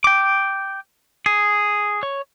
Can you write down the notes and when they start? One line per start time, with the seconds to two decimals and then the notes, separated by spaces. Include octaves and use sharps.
0.04 G5 D6
1.26 G#4
2.03 C#5